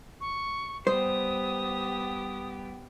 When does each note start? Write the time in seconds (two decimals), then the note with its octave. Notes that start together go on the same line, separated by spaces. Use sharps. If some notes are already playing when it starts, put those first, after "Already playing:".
0.21 C#6
0.87 G3 B3 G4 C5 D#6